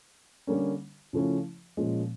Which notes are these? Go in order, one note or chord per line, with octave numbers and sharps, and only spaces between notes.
D3 G3 A#3 C#4
C#3 F3 A3 C#4 E4
A#2 F3 G#3 C#4